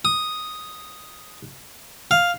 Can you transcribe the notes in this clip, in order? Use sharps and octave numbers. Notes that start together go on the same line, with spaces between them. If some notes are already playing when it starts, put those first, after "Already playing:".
D#6
F5